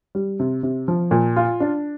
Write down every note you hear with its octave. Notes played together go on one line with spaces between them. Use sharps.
G3
C3
C3
F3
A#2
F4
D4